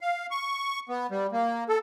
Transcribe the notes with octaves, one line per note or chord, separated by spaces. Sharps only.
F5
C#6
B3
G3
A#3
A4